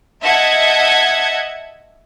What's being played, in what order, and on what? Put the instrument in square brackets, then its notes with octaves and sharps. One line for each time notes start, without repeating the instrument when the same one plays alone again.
[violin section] D#5 E5 F#5 A5 G#6